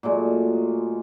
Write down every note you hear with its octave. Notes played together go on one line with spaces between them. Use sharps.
A#2 F#3 G#3 A3